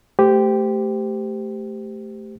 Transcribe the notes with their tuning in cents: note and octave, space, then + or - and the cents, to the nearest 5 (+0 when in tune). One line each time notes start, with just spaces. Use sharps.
A3 +0 G4 +0 C5 -30